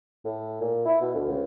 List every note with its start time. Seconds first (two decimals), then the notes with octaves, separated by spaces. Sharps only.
0.25 A2
0.61 A#2
0.85 E4
1.01 B2
1.14 D2
1.28 C#2